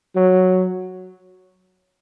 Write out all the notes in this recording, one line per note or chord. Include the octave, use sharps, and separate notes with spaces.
F#3